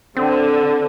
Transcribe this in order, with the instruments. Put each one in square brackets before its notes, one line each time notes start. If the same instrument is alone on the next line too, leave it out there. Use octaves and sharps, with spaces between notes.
[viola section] D3 [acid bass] C4